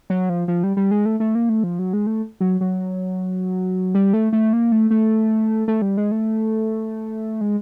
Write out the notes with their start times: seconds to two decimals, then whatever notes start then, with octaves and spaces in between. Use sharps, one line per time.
0.10 F#3
0.29 F3
0.48 F3
0.63 G3
0.77 G3
0.91 G#3
1.06 A3
1.20 A3
1.35 A#3
1.49 A3
1.63 F3
1.79 F#3
1.93 G#3
2.07 A3
2.41 F#3
2.61 F#3
3.95 G3
4.13 A3
4.33 A3
4.53 A#3
4.72 A3
4.90 A3
5.68 A3
5.82 G3
5.97 G#3
6.11 A3
7.41 G#3